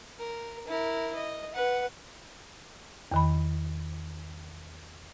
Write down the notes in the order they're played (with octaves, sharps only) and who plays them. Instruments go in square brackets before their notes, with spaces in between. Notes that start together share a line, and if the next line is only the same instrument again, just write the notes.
[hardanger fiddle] A#4
E4 A#4
D#5
B4 F#5
[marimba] E2 D#3 B5